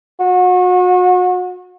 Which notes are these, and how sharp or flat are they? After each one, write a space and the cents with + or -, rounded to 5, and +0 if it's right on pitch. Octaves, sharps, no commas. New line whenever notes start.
F#4 -35